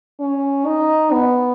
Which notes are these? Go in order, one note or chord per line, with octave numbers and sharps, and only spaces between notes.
C#4
D#4
B3